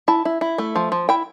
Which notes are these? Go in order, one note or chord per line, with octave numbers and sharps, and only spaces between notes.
E4 A5
E4
E4
A3
F3
F3
E4 G5